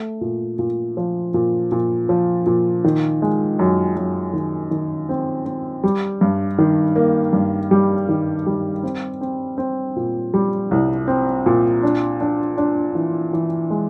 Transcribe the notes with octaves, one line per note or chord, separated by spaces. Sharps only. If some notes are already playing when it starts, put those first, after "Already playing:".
Already playing: A3
A#2
A#2
F3
A#2
A#2
F3
A#2
D#3
G#3
F#2
F#2
D#3
D#3
C4
C4
G3
G2
D#3
A#3
G2
G3
D#3
G3
C4
C4
C4
A#2
G3
C2
C4
A#2
D4
D4
D4
E3
E3
G#3